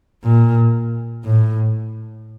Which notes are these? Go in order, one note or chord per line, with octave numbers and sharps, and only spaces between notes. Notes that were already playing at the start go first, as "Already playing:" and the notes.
A#2
A2